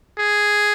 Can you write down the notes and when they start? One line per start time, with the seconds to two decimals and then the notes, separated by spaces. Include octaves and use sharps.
0.18 G#4